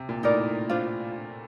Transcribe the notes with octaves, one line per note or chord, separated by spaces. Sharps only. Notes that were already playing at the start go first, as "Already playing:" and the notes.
Already playing: C3
A#2
A2 D#4 A#4 D5
D4 F4 C5